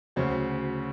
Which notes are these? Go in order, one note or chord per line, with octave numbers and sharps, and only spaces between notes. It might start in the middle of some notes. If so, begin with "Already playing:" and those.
D2 C#3 F#3 C5